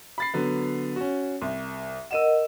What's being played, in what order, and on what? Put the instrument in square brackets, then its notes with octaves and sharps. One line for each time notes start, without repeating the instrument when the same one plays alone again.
[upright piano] B5 A6 C7
D3 F#3 B3
C#4 F#4
C2
[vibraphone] A#4 D#5 F#5 [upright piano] E6 D#7 E7